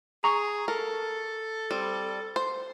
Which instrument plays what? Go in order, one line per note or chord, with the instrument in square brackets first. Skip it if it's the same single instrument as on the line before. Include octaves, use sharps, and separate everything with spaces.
[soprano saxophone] G#4 [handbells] A#5 C#6
[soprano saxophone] A4 [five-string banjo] A#4
[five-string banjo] G3 C4
C5